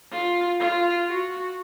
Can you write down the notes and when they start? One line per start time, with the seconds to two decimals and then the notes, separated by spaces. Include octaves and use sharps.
0.12 F4
0.60 F4
1.08 F#4